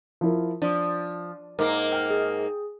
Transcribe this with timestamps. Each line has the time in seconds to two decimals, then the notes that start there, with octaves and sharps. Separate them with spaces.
0.21 F3 E4 A#4
0.62 F3 D4
1.59 G#2 A#3 A#4
1.92 G5 F6
2.10 G#4